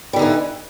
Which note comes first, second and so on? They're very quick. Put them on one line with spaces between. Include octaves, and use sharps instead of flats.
G3 D3 D#4 E3